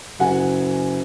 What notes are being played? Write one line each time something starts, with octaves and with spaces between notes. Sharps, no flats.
F#1 F#4 F#5 G#5